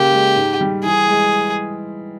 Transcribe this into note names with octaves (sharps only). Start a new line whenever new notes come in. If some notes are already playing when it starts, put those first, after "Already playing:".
Already playing: C#3 A#3 G4
G#3
G#2
G3
E3 G#4
G#3